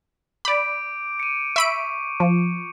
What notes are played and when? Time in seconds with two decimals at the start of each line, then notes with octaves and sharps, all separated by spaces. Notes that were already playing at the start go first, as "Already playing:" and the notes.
0.45 D5 B5 D6 G6 D7
1.19 C#7 D#7
1.56 E5 B5 C#6 D7
2.20 F3